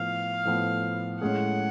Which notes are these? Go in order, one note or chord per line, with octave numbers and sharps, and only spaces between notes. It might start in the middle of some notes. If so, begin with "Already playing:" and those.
Already playing: A2 F3 B3 F5
A2 F3 B3
A2 G#3 C#4 G#4 F#5